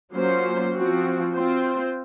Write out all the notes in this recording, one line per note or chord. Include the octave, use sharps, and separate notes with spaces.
F#3 A#3 C#4 F4 C5
F3 C4 F#4
C4 F4 C5